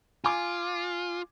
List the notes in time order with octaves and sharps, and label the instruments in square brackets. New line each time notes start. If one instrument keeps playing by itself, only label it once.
[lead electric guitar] F4 [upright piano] G#5 D6